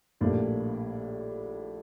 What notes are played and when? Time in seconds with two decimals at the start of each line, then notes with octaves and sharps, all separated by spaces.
0.21 A#1 A2 G3 A#3 D4